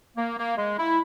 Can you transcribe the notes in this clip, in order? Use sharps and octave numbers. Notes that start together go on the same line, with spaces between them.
A#3
A#3
G#3
E4